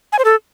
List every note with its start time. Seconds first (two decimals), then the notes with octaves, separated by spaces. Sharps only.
0.12 G#5
0.19 C5
0.25 A4